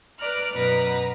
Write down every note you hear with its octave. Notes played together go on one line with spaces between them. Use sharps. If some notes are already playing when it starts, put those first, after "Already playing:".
B4 D5 A#5 F6 F#6
F#2 B2 B4 A#5